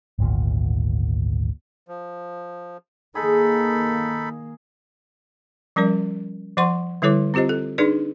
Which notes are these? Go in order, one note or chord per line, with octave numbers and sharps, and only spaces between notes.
G#1 D2 A#2
F3
D#3 A#3 D#4 G#4 A4 B5
F3 G3 C#4 A#4 D5
F3 C5 F#5 C6 C#6
D3 G3 E4 A4 C#5 D6
C4 F4 G4 C5 D#5
A4
D4 D#4 G#4 B4 D5